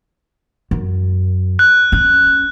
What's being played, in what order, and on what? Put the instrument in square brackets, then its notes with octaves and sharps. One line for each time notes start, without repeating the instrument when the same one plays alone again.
[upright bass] F#2
[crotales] F#6
[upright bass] C#4